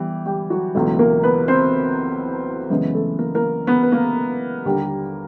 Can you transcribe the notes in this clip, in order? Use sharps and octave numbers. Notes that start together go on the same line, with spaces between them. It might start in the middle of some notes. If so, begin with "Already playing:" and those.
Already playing: E3 G3 B3 G4
G3 G4
F#3 F#4
C#2 B2 E3 F#3 A3 E4
A#3 A#4
B3 B4
C4 C5
F#2 C#3 E3 G#3 B3 B4
A3 A4
A#3 A#4
A#3 A#4
B3 B4
B4
A#3 A#4
D#2 D3 G3